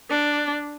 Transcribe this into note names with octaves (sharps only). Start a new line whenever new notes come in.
D4